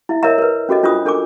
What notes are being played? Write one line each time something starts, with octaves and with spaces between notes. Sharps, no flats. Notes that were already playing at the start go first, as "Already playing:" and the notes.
E4 E5
A#4 C#5 D#5 E5 A#5
A#4 B4
C#4 F#4 A4 D#5
D4 F4 F#4 C5 D#6
D4 A4 A#4 G#5 D6